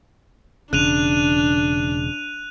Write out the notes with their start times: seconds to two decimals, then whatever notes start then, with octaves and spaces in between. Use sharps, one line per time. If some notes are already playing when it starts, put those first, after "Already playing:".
0.73 E1 C#3 D4 F#6 D#7 F7